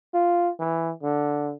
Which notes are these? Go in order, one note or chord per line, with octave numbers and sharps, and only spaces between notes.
F4
E3
D3